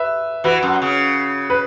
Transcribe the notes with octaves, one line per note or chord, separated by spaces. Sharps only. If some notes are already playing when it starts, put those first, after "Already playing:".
Already playing: B4 E5
E3 F#4 B4
F#2
C#3
B4